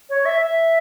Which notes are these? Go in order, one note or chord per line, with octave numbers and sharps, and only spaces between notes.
C#5
E5
E5